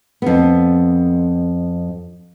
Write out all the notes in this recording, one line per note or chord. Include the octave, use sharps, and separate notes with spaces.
F2 B3